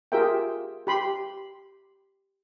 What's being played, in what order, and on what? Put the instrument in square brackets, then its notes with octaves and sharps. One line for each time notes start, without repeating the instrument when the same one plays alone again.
[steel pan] F4 G4 G#4 A#4 E5 G5
G4 B5 C6